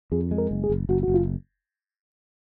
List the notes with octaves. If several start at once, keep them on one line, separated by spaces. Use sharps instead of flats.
F2 G#4
G#3
A#4
F#1
G#4
F#1
F#1 F#4
F#1 F#4
F4